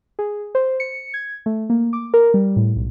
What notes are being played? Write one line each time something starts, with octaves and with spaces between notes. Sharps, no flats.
G#4
C5
C#7
G#6
A3
A#3
D6
A#4
G3
A2
B1